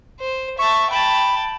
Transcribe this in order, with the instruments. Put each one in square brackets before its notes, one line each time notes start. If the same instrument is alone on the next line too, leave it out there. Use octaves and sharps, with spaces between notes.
[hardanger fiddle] C5
[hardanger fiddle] E5 A5 [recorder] C#6
[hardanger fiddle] G5 A5 [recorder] B5